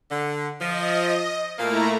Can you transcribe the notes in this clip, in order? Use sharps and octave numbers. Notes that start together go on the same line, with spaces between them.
D3
F3 D#5
A#2 A3 A#3 E4 A#5